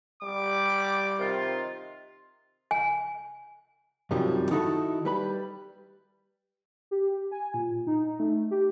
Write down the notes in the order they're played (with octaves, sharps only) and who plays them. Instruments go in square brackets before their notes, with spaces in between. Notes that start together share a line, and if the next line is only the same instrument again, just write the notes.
[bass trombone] G3 [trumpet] D6
[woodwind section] C3 D#3 F4
[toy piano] G#5
[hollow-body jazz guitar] F#2 C3 D#3 F3 G3
D#3 D#4 E4 F#4 G4 A4
G3 B4 B5
[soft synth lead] G4
G#5
A#2
D#4
A3
G4